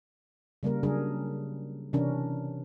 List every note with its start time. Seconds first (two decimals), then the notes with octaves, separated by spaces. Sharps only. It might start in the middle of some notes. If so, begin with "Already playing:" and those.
0.63 C#3 G3 A#3 A#4
0.83 C#3 F#3 G3 D4 G#4 A#4
1.93 C3 E3 C#4 D4 A#4